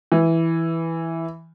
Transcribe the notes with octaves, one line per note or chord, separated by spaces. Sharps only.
E3